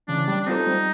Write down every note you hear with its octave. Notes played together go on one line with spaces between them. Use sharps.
C#3 E3 D4
G3 D4
D4
C4 D#4 F4 A4 C5
G3